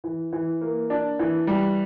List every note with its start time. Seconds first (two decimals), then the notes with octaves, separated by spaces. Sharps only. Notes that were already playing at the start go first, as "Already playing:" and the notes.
0.04 E3
0.33 E3
0.61 A#3
0.90 D4
1.19 E3
1.47 G3